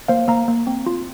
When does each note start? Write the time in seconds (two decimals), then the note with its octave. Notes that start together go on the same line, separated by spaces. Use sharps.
0.08 A#3 C5 F5
0.28 A#3 F5 A#5
0.48 A#3
0.67 C4
0.86 F4